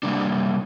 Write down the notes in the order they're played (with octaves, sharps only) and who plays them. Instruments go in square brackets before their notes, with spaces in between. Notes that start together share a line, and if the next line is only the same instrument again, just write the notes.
[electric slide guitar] C3 G3 A#3 D4